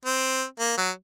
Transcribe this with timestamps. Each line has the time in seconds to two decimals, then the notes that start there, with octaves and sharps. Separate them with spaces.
0.05 C4
0.60 A#3
0.78 F#3